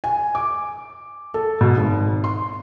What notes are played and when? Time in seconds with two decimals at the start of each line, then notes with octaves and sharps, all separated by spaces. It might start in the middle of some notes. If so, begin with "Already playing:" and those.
0.04 G#5
0.35 D6
1.34 A4
1.61 B2
1.77 G#1
2.24 C6